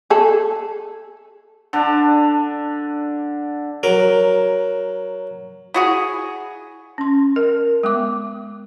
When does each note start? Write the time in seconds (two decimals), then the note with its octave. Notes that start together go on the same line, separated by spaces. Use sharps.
0.10 G#4 A4
1.73 D3 D4
3.83 F#3 A#4
5.74 E4 F#4 G#4
6.98 C#4 C6
7.36 A#4
7.83 G#3 B3 D6